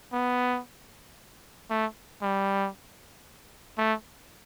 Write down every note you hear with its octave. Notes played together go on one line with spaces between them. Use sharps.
B3
A3
G3
A3